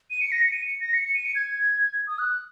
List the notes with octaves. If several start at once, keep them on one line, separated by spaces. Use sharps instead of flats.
D#7
C#7
A#6
C#7
D#7
C#7
A#6
C#7
C#7
D#7
C#7
G#6
D#6
F#6